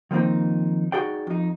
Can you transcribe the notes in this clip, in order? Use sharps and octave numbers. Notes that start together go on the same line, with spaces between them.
D#3 F3 A#3 C4 D#4
D#4 F#4 G#4 D5 G5
F2 D#4